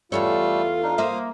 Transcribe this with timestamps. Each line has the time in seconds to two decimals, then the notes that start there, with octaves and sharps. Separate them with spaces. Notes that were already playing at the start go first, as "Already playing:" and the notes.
0.12 E2 G2 G3 A3 F4 A4 C#5 E6
0.83 D4 D#4
0.98 A#3 C5 E5 F5 D#6